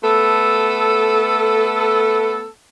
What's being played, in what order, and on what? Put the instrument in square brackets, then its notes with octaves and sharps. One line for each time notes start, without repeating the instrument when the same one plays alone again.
[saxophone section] A3 B3 A4